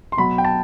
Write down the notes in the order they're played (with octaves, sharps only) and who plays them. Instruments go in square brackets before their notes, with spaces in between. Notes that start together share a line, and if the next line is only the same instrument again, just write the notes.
[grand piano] C6
B2 F#3 B5
G5
A5